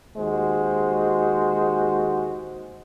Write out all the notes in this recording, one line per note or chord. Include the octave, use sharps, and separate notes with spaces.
D#2 G#3 F#4 C5